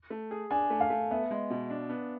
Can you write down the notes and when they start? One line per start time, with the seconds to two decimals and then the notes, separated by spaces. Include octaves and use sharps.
0.10 A3
0.31 G#4
0.50 D4 G#5
0.70 A3
0.80 F5
0.90 A3
1.11 B3 E5
1.31 G#3
1.50 B2
1.70 D4
1.89 B3